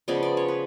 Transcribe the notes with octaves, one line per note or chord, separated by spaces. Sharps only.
C#3 F3 G#3 B3 D5
D5
C#5
B4